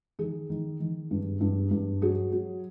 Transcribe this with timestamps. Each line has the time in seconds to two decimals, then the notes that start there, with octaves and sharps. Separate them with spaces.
0.19 D#3 G#4
0.50 D#3
0.80 D#3
1.11 G2
1.40 G2
1.71 G2
2.02 F#3 G#4
2.32 F#3